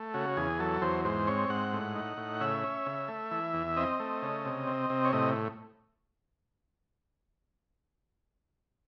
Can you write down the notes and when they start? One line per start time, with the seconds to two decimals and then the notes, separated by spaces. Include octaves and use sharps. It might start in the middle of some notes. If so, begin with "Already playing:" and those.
Already playing: A3
0.14 C#3 F#4
0.37 E2 G#4
0.59 F#3 A4
0.82 E2 C5
1.05 G#2 C5
1.27 C4 C#5
1.49 G#2 F#5
1.73 A2
1.95 D#4
2.17 A2
2.41 C#3 E5
2.64 C#4
2.86 C#3
3.08 A3
3.31 E3
3.53 E2
3.77 C4 D#5
4.00 A3
4.22 C#3
4.45 C3
4.67 C4
4.90 C3
5.05 C#5
5.13 A2 D#5